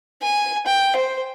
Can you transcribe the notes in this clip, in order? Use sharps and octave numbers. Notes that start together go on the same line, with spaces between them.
G#5
G5
C5